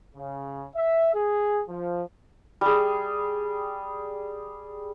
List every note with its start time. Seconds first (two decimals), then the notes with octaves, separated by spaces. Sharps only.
0.16 C#3
0.75 E5
1.14 G#4
1.69 F3
2.61 G3 G#4